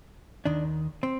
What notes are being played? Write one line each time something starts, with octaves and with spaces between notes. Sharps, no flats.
D#2 D#3 D4
C4